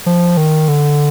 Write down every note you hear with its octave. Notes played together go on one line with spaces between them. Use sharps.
F3
D#3
D3